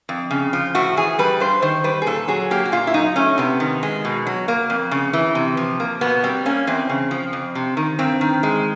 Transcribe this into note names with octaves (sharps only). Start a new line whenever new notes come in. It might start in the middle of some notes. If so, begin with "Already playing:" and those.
F2
C#3
F3
A2 F#4
E3 G#4
G3 B4
G2 C5
D#3 C5
G3 B4
G#4
A#2 A4
F#3 G#4
A#3 G4
F#4
A#2 F4
E4
F#3 D#4
A3 C#4
C3 B3
D#3
G#3
B2
F#3
A#3
F2
C#3
E3
C3
F3
A#3
B2 B3
G3 C4
A#3 C#4
E2 C4
C#3
F3
F2
C3
D#3
G2 C4
D#3
G#3